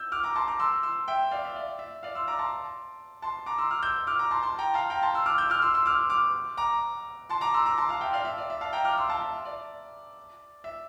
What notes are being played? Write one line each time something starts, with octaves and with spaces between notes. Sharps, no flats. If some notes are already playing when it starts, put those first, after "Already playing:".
Already playing: E6 G6
D6 F6
A#5 D6
A5 C6
A#5 D6
C6 E6
C6 E6
E5 G5
D5 F5
E5
D5
E5
D5 F5
C6 E6
A#5 D6
A5 C6
A5 C6
A#5 D6
C6 E6
D6 F6
E6 G6
D6 F6
A#5 D6
A5 C6
A5 C6
G5 A#5
F5 A5
G5 A#5
A5 C6
C6 E6
D6 F6
E6 G6
D6 F6
C6 E6
C6 E6
D6 F6
D6 F6
A#5 D6
A5 C6
A#5 D6
C6 E6
A#5 D6
A5 C6
F5 A5
E5 G5
D5 F5
E5
D5
E5
F5 A5
G5 A#5
D6 F6
C6 E6
F5 A5
E5
D5
E5